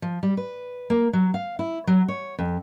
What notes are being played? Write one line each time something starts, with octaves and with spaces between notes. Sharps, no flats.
F3
G3
B4
A#3
F#3
F5
E4
F#3
C#5
F2